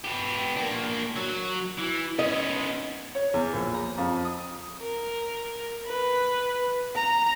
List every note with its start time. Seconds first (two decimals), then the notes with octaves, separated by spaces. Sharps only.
0.04 B3 G4
0.56 A#3 D4
1.16 F#3
1.78 E3
2.19 B3 C#4 D#5
3.15 C#5
3.34 E2
3.53 A#1
3.74 A#5
3.98 F2
4.25 D#6
4.83 A#4
5.88 B4
6.96 A#5